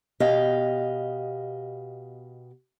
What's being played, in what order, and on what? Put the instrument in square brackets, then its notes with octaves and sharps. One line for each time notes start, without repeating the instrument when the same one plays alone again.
[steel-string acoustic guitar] B2 G4 D#5 F5